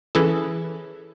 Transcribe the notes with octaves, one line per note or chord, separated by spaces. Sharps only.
E3 C#4 E4 G#4 A4